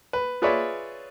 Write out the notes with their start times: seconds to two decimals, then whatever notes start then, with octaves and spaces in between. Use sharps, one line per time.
0.13 B4
0.42 F4 G#4 B4 C#5 D5 E5